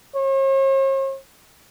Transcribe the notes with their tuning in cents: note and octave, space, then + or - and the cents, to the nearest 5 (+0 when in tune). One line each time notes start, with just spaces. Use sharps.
C#5 -45